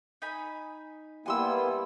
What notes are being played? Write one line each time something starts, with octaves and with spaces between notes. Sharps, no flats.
D#4 G#5 B5
G3 A#3 B3 E4 F#5 G#5 C6 E6